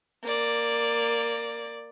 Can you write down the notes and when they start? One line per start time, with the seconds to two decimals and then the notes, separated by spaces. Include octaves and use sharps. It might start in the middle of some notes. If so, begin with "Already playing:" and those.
0.23 A#3 D5